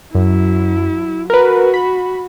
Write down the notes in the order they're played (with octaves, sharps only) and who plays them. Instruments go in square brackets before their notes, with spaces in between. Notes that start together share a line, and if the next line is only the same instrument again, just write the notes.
[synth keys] F#2 [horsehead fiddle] F#3 E4
[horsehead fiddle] F#4 [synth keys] A#4 B4
[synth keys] B5